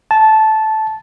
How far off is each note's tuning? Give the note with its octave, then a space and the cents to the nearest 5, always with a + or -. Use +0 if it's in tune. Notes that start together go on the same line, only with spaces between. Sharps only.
A5 -10